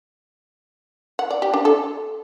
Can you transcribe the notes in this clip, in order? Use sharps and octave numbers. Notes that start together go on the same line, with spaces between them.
F#5
D5
G4
D4
A4